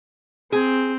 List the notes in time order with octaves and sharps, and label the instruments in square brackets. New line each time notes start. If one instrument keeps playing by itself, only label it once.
[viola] C4 [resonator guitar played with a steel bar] G#4